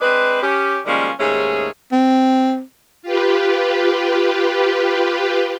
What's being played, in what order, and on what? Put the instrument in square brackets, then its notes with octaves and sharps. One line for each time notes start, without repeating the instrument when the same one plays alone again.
[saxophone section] G#3 C4 D4 B4
C#4 G4
D#3 F3 G3 G#3 A#3 C#4
D#2 G#2 A3 C#4 G#4
[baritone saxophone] C4
[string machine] F4 G4 B4